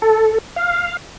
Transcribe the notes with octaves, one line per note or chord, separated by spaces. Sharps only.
A4
F5